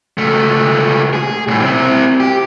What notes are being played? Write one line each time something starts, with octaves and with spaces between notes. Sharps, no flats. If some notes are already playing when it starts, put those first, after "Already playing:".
C#2 A3
G#4
C2 A2
C4 E4
G4